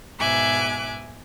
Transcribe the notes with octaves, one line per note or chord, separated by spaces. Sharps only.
G#2 B2 E5 G#5 D6 F#6